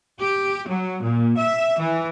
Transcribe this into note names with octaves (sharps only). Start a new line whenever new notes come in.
G4
F#3
A#2
E5
E3